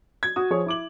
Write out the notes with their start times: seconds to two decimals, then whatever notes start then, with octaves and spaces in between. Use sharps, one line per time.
0.23 G#6
0.36 F#4 D#6
0.50 F3 G#4 C#5
0.66 E4 D6 F#7